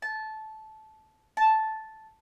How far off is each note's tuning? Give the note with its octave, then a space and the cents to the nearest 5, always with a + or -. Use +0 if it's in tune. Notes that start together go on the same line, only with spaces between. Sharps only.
A5 -15
A5 -5